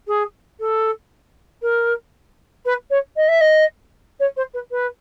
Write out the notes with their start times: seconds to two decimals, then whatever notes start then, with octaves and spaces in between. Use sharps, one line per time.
0.08 G#4
0.60 A4
1.62 A#4
2.65 B4
2.90 C#5
3.17 D#5
3.28 E5
3.41 D#5
4.20 C#5
4.37 C5
4.54 B4
4.71 B4